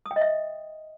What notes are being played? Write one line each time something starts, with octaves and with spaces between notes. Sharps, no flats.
D#6
G5
D#5
E5